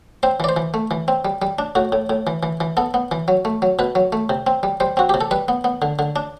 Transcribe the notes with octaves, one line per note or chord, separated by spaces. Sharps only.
C4 C5
E3 D5
C5
E3
A3
E3
C4
G3
G3
D4
A2 F#4
A2
A2
E3
E3
E3
B3 A4
B3
E3
F#3
A3
F#3
B2 B4
F#3
A3
C3
C4
G3
G3 C5
C4 F#4
C3 G4
A4
G3 B4
B3
B3
D3
D3
D4